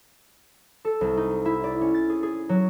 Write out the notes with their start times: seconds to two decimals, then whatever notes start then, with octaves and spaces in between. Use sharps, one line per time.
0.85 A4
1.01 C2
1.17 D#4
1.45 E4
1.64 D5
1.81 C#4
1.94 A6
2.10 G#4
2.23 G#4
2.49 F#3